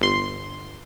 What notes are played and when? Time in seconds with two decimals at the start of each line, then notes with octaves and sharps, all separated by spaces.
0.01 G1 C6